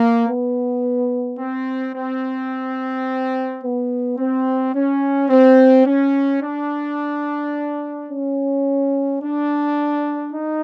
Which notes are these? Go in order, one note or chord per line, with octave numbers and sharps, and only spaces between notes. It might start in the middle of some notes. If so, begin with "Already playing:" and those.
Already playing: A#3
B3
C4
C4
B3
C4
C#4
C4
C#4
D4
C#4
D4
D#4